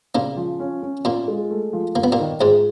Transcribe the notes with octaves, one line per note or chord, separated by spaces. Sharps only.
A#2 C#3 A#3
F3
C#4
C#4
A#2 A#3 F4
G#3
A3
F3
G2 A#3
B3
A#2 A#3
D#3
G#2 G#3 F4